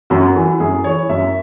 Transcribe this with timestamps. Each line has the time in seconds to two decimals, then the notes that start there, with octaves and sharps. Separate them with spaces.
0.10 F#2 F#4
0.35 E3
0.60 F#2 G#4
0.84 E3 C#5
1.09 F#2 E5